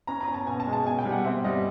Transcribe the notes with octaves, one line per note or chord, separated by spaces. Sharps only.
C#4 A#5
A#5
C#4
A5
B2 G#5
A5
G#3
A5
B2 G#5
G5
G3
F#5
C4 E5
G3 D#5